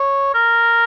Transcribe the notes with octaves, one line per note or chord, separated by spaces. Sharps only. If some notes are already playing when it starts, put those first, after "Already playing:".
Already playing: C#5
A#4